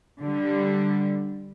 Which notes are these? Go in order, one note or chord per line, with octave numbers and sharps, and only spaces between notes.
D3 G3